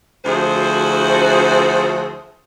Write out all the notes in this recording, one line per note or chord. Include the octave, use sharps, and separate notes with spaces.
D2 F3 E4 F#4 G#4 C5